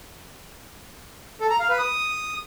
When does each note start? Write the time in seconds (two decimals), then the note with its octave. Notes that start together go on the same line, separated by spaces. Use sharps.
1.40 A4
1.50 A#5
1.59 F5
1.69 B4
1.78 D#6